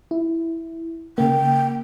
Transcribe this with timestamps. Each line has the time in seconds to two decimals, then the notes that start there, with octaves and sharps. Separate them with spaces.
0.11 E4
1.18 C#3 A#3 G5